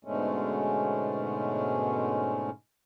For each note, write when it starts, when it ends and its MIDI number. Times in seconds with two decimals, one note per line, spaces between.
0.05 2.50 44
0.05 2.50 47
0.05 2.50 50
0.05 2.50 56
0.05 2.50 57
0.05 2.50 61